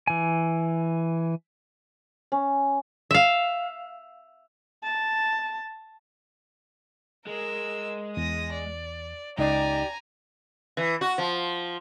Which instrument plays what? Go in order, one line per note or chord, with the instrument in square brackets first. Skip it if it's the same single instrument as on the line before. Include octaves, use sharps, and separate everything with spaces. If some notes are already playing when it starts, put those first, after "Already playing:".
[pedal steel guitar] E3 G#5
[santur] C#4
[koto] E5 F5
[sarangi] A5
[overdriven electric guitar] G#3 [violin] A#4 E6
[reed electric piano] E2 [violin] D#6 A#6
[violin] D5
[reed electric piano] C#2 D#4 [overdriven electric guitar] G4 [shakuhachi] D5 [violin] G#5 A#5
[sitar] E3
F#4
F3